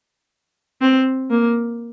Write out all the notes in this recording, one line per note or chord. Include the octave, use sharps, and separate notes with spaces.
C4
A#3